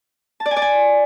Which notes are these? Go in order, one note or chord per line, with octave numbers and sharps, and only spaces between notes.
A5
D5
G#5
D5
G#5